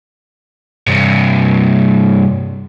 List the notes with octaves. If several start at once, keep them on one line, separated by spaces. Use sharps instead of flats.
G2 C3